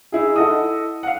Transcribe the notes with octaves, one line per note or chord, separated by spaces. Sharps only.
D#4 E4 G#4
E4 A4 D#5 F#5 D#6
F5 F#5